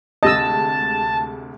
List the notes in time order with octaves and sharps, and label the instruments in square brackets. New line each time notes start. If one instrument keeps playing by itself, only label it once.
[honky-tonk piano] D2 C3 G#3 [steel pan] D#5 E6 [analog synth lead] A5